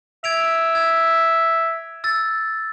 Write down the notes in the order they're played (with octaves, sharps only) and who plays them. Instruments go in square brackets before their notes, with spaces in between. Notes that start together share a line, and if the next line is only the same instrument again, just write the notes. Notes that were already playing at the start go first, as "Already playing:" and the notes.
[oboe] E5 [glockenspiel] G#6 D7 F7
[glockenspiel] G#6
E6 A6